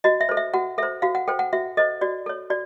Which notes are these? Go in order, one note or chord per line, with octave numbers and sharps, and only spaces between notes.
F#4 D#5
E5
A4 C5
E5
F#4 F#5
A4 C5 E5
F#4 F5
F#5
A4 C5 G5
F#5
F#4 E5
A4 C5 D#5
F#4 D5
A4 C#5
F#4 D5